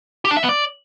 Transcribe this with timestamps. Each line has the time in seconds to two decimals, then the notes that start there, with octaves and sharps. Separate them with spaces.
0.25 G4
0.31 D4
0.37 E5
0.43 B3
0.49 D5